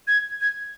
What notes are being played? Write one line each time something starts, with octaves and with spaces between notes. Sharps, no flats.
G#6
G#6